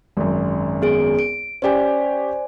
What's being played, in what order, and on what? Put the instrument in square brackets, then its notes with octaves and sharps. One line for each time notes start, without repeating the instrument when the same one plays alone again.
[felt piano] G#1 F#2
[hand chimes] B3 G#4 D7
D7
[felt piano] C#4 G4 [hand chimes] C5 D5 G#5